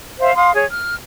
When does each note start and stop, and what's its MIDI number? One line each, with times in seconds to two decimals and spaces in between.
0.20 0.33 72
0.20 0.33 76
0.20 0.33 77
0.35 0.52 77
0.35 0.52 84
0.35 0.52 87
0.54 0.64 68
0.54 0.64 73
0.70 0.94 89